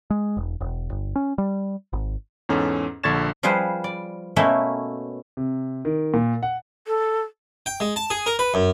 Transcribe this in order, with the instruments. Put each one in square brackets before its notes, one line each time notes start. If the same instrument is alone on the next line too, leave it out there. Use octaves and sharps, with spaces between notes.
[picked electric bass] G#3
E1
E1
G1
C#4
G3
G#1
[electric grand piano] E2 G#2 C#4 A4
A#1 D3 C#6 G#6 A6 E7
[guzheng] F3 G3 F4 G#4 B4 C5
D5
B2 A3 A#3 C#4 E4 E5
[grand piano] C3
D#3
A#2
F#5
[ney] A4
[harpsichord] G5
G#3
A5
G#4
A#4
B4
F#2